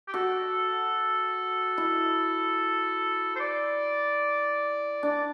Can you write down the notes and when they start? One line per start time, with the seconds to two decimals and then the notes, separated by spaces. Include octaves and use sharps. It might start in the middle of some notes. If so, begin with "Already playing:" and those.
0.08 G4
0.14 F#4 A4
1.78 E4
3.36 C5
3.40 D5
5.03 D4 D5